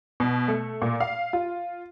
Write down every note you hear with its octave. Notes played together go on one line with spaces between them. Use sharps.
B2
A3
A#2
F5
F4